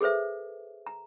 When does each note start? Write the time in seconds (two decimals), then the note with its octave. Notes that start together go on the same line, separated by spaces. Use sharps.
0.01 G#4 A4 B4 C5 E5
0.87 A#5